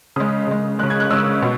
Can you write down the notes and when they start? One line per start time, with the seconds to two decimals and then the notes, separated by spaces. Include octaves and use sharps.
0.16 C#3 G#3 D#6
0.47 C#3 G#3
0.79 C#3 G#3 F#6
0.90 G#6
1.00 F#6
1.10 C#3 G#3 E6
1.42 B2